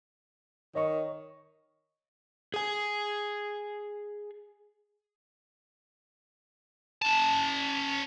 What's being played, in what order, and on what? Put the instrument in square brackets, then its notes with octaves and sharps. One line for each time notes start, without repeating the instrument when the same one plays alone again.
[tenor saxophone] D#3 [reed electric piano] C#5 D#5 C#6
[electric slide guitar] G#4 G#5
[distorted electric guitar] C#4 A5